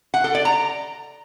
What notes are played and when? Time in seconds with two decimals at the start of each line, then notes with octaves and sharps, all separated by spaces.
0.14 F#5
0.24 A4
0.35 D5
0.45 A#5